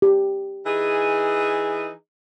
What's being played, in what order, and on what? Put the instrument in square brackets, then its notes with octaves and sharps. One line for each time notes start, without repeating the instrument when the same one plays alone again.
[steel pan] G4
[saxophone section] E3 D#4 G#4